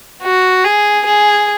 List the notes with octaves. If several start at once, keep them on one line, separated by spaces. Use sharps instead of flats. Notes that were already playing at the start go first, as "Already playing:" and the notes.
F#4
G#4
G#4